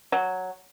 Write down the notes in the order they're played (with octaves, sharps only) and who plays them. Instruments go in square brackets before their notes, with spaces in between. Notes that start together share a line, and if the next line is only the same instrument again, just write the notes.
[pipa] F#3